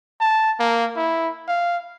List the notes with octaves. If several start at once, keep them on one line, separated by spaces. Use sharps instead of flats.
A5
A#3
E4
F5